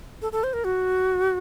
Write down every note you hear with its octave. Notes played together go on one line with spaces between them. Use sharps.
A4
A4
C5
A#4
F#4